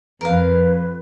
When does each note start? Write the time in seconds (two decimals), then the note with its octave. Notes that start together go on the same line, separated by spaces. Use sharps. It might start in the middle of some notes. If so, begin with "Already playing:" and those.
0.21 F2 A#4 B4 F5